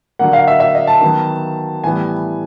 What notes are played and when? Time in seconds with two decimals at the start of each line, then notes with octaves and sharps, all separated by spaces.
0.19 D3 F#3 A#3 F#5
0.33 F5
0.48 E5
0.60 E5
0.75 D#5
0.87 A5
1.01 D#3 F#3 B3
1.84 A2 E3 G3 B3 G#5